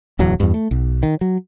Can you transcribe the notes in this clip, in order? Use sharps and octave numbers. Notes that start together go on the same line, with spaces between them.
D1 E2 F#3
E2 G2
A3
B1
D#3
F#3